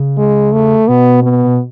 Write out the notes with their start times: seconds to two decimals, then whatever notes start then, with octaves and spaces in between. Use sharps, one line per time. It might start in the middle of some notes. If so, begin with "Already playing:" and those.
Already playing: C#3
0.18 G#3
0.53 A3
0.88 B2 B3
1.23 B3
1.46 B2